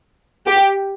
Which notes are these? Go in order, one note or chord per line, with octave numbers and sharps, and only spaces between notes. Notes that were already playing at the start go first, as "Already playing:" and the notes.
G4